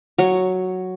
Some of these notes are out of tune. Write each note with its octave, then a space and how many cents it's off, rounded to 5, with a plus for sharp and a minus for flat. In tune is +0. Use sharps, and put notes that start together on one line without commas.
F#3 +0 C#5 +0